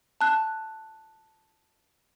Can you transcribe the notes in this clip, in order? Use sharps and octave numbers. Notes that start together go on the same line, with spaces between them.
A5 F#6